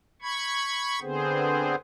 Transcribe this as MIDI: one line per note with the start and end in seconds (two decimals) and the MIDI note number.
0.22 0.99 83
0.22 0.99 85
0.22 0.99 92
1.02 1.75 50
1.02 1.75 59
1.02 1.75 60
1.02 1.75 68
1.02 1.75 72